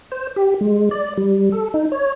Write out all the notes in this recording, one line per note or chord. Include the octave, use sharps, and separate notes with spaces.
C5
G4
G#3
D5
G3
A4
D#4
C#5